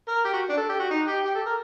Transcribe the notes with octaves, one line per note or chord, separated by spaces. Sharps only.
A#4
G4
F#4
D4
A4
G4
F#4
D#4
G4
G4
A4
A#4